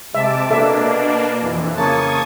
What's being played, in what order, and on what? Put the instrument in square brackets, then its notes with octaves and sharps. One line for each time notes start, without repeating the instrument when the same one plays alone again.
[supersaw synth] C3 A5 D6 [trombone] G#3 [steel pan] E5
[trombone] B2 [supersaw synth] A#3 D4 [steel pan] A4 E5
[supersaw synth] F2 E3
[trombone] C#3 [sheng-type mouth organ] A#3 A5 [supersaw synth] C#6 D#6 G#6